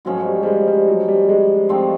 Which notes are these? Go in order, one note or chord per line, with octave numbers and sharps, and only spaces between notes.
G#2 F3 F#3 A3 C#4
G3
G3
G#3
G3
F#3
G3
G#3
F3 A3 C4 D#4